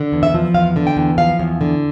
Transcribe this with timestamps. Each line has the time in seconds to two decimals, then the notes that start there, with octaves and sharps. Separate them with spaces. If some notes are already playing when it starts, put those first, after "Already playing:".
Already playing: D3
0.12 E2
0.23 E5
0.34 F3
0.54 E2 F5
0.76 D3
0.87 G5
0.97 E2
1.18 F3 F5
1.39 E2
1.61 D3